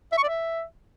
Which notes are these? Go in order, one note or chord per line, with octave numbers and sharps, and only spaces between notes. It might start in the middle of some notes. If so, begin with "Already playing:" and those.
E5
C#6
D5
E5